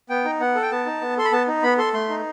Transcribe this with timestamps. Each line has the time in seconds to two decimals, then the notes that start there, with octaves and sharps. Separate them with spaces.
0.10 B3 G5
0.25 D#4
0.40 B3 F#5
0.55 A4
0.62 G5
0.71 B3 A5
0.86 D#4
1.01 B3
1.17 A4 C6
1.25 B5
1.32 B3 A5
1.47 D#4
1.63 B3 B5
1.78 A4 C6
1.94 A3 C6
2.09 D#4